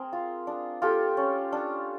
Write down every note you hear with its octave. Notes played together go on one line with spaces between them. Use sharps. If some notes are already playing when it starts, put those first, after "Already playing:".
Already playing: C4 G#4 A#4
F4
D4
F4 G4 A4
C#4
D4